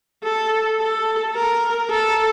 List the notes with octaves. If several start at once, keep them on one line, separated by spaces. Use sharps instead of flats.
A4
A4
A#4
A4